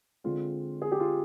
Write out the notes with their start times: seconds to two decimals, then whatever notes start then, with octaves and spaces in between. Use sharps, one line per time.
0.24 D3 G#3 C4 F4
0.82 G#4
0.92 G4
1.00 F4